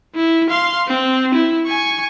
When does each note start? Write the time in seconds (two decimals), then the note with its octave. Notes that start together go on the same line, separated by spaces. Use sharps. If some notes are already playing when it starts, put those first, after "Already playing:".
0.15 E4
0.50 F5 C6
0.88 C4
1.35 E4
1.67 G#5 C#6